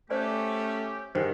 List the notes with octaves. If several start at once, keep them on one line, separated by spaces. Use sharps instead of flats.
A3 C#4 G4 C5 D5 G#5
G2 D#3 G#4 C5 F#5